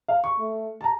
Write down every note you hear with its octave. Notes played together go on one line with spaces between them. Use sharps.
F5
C#6
A3
A5
A#5